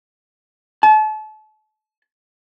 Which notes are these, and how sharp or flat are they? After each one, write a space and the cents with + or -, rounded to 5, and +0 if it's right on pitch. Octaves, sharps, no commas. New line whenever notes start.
A5 -35